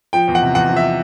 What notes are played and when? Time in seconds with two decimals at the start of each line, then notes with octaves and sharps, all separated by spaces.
0.13 F3 G5
0.28 E2
0.35 F#5
0.42 C3
0.55 E2 F#5
0.69 F3
0.76 E5